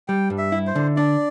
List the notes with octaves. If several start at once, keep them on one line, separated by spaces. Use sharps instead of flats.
G3 G5
G2
E5
E4
C5
D3
D4 D5